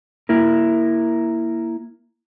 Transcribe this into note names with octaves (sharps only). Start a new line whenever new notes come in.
A#3 E4 A#4